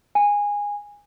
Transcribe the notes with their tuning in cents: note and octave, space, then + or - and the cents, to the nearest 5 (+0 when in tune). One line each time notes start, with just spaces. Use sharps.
G#5 -15